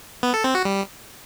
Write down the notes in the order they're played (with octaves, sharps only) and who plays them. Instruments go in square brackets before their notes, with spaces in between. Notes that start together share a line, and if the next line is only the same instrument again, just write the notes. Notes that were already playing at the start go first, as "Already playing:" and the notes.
[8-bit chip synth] B3
A4
C4
F#4
G3